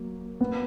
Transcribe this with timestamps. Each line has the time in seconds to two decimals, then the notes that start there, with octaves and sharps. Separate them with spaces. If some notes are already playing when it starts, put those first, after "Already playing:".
Already playing: F#3 A#3
0.41 B3